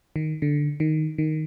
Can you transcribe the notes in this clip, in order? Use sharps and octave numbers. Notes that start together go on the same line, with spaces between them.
D#3
D3
D#3
D#3